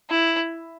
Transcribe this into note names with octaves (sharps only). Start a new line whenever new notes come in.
E4